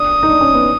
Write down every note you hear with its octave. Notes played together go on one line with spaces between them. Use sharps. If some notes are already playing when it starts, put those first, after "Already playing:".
Already playing: D4 D#6
D#4
D4
C#4
B3